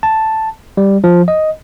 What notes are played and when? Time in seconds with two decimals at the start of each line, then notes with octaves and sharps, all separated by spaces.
0.03 A5
0.77 G3
1.04 F3
1.28 D#5